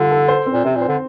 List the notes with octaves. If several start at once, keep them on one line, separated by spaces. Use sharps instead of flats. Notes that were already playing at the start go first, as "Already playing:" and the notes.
Already playing: D3 G3 F4 A4
A4
C5
C4
A#2
C3 C4
A#2
C5
D3